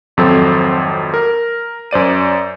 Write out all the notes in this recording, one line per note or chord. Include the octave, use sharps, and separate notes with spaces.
G#1 F2 F#3 C4 A4 C5
A#4
F#2 C5 D5 D#7